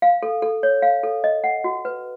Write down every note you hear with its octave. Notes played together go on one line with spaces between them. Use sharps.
F5
A4
A4
C#5
F5
A4
D#5
F#5
F#4
B4